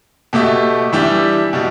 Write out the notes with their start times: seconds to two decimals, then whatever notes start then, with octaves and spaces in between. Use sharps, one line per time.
0.33 B2 A3 G4 E5
0.92 E3 G3 D4 G4 E5
1.53 B2 G3